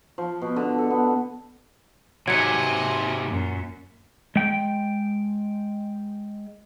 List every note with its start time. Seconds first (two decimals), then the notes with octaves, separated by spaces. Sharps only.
0.18 F3
0.42 B2
0.56 D3
0.78 A4
0.90 B3
2.28 G#2 C3 F#3 D#5 G#5 G#6 C#7
3.27 F#2 A#2
4.36 G#3 G5